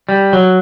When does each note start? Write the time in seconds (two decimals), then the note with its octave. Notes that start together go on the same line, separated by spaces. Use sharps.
0.09 G3
0.33 F#3